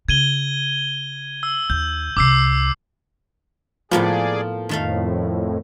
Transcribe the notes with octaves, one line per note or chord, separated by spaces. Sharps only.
C#3 G#6 D#7 G7
E6
D#2 G6
C2 C3 D6 E6 C7
A2 F3 A#3 B3 G#4 D5
F2 A2 D#3 A3 F5